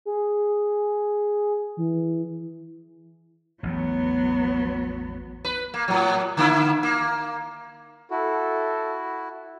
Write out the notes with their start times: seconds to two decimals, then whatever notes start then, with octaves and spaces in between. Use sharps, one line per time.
0.06 G#4
1.77 E3
3.63 A1 E2 A2 F#3 B3
5.45 B4
5.74 A#3
5.88 A2 F#3
6.37 D3 A#3 E4
6.83 A#3
8.11 E4 F#4 A4